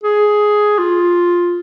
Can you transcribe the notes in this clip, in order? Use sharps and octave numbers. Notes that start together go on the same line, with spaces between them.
G#4
F4